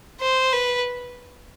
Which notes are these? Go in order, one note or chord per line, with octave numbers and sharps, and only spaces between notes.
C5
B4